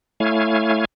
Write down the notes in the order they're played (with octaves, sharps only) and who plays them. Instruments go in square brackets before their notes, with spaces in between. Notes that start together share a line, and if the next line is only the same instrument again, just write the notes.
[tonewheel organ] A3 E4 C#5 F5 G#5